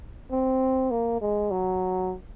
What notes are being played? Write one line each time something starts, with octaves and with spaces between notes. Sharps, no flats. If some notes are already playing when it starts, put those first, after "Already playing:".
C4
A#3
G#3
F#3